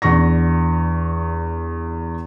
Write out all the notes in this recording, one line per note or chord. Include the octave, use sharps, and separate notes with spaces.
E2 D4 C#6 A#6